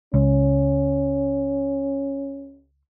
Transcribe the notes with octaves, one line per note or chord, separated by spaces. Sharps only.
C#2 C#4